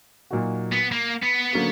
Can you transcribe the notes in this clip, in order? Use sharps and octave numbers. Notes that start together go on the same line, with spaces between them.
A#2 F#3 A#3 D#4 F#4
B3
A#3
B3
D3 F#3 A#3 C#4 F#4